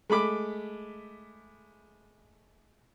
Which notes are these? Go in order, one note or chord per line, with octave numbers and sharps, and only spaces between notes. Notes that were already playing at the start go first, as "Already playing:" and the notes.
G#3 A3 B5 D6